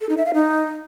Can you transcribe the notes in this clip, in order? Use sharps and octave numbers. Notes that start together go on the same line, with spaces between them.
A4
D#4
E5
F5
D#4